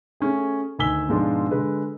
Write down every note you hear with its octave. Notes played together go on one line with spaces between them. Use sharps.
A3 C#4 G#4
D2 D#3 G#5 E6 B6 G7
G#2 B2 F3 G#3 D4 F4
D3 G#3 B4